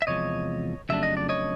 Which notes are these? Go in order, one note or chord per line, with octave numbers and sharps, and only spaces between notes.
E5
E2 C3 F3 G#3 C#5 D#5
F2 C#3 F#3 A3 D4 E5
D#5
D5
C#5 D#5